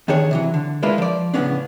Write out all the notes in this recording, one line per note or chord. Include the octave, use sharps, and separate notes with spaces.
D#2 D#3 D4 G#4 C#5
C3 E3 F#3
D3
G#3 A#3 D4 E4 F4 B4
F3 D5
A2 C#3 G#3 B3 C#4 D4